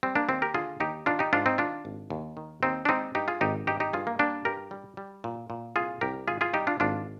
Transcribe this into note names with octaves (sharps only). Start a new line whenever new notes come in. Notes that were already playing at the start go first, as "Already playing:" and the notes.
G3 C4
A#3 D4
D#2 C4
G4 A#4
D3 F4 G#4
D#2 D#4 G4
D#3 D4 F4
D#4 G4
G#2 D4 F4
C4 D#4
D#3 D4 F4
G#1
D#2
D#3
D#2 C4 D#4
D4
G#3 C4 D#4
G2 D#4 G4
F4 G#4
G#1 D#4 G4
G2 D#4 G4
D#4 G4
G2 F4 G#4
A#3
G3 A#3 D4
G2 G4 A#4
G3
G3
A#2
A#2
C2 F4 G#4
C2 G4 A#4
G#1 F4 G#4
F4 G#4
G3 D#4 G4
D4 F4
G#1 D4 F4